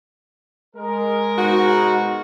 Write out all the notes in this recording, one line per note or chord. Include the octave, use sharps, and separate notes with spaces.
G#3 A#4
G#2 B2 F#4